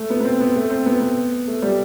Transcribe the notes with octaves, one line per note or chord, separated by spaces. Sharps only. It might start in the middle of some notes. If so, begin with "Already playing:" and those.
Already playing: A3
B3
B3
C4
B3
A3
C4
B3
B3
A3
G3